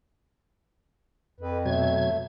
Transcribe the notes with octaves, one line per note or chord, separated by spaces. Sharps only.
F2 B4
B2 F#3 A3 G#6